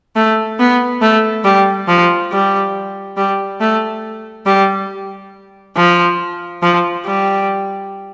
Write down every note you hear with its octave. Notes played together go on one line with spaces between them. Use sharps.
A3
B3
A3
G3
F3
G3
G3
A3
G3
F3
F3
G3